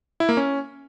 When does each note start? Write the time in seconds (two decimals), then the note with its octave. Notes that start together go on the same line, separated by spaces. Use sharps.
0.20 E4
0.29 A#3
0.37 C#4